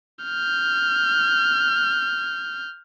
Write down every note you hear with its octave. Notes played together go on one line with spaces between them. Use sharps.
F6 G6